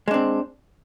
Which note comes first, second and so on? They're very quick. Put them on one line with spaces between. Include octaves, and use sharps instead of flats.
G#3 D4 C4